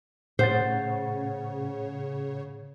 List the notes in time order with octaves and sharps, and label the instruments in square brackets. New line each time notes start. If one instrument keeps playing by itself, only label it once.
[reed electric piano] A2 F#5 A6 [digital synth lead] C#3 [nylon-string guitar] C5